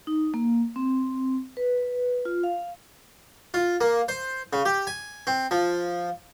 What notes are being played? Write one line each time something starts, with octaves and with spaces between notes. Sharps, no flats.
D#4
A#3
C4
B4
F4
F5
F4
A#3
C5
C#3
G4
G#5
C4
F3